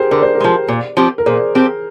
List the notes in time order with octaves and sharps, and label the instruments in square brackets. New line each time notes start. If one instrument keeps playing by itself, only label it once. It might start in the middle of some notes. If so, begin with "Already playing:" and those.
Already playing: [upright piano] G4 G#4 A#4 C5
[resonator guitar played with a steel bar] D3 [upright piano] A#4
[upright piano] C5
G4 A#4
[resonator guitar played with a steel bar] F3 G#3
A#2
F3 C4 G4
[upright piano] A#4
[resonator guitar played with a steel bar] A#2 [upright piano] G#4 C5
[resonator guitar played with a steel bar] F3 C4 G4